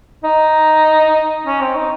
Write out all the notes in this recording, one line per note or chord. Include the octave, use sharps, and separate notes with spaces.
D#4
C#4
C4
D#4